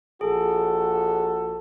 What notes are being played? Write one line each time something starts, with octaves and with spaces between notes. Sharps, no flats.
A#1 F#4 G#4 A4